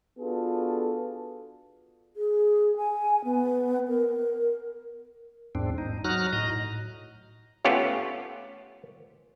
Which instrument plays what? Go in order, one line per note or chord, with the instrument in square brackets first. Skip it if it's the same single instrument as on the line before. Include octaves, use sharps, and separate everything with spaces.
[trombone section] B3 D4 F4 F#4 G#4 A4
[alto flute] G#4
G#5
B3
A#4
[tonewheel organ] E2 G#2 C4 D4
D#4
F#3 D#4 F#4 A#5 F6 F#6
A2 D#5 A#5
[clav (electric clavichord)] A3 B3 C#4 F4 G4 C#5